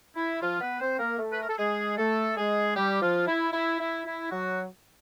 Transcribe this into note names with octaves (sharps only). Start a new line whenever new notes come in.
E4
F3 F4
B3 B4
C4 C5
A#3 A#4
A3 A4
B4
A#4
A4
G#3 G#4
A3 A4
G#3 G#4
G3 G4
F3 F4
E4
E4
E4
E4
F#3 F#4